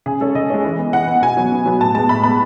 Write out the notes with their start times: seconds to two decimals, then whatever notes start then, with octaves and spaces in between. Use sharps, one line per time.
0.06 C#3 G#4
0.20 G#3 C#4 A4
0.35 C#3 D#5
0.50 G#3 C#4
0.65 E3
0.79 B3
0.93 E3 F#5
1.07 B3
1.22 B2 G#5
1.37 F#3 B3
1.52 B2
1.66 F#3 B3
1.80 A2 A5
1.95 G#3 B3 A5
2.09 A2 B5
2.24 G#3 B3 B5